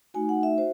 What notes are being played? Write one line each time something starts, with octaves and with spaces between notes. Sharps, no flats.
A3 D#4 F#4 G#5
F#5
E5
F#4 C5